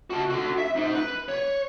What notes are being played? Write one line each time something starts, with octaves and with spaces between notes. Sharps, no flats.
F#4 A5
D3 F#4
E5
D#4 C5
B4
C#5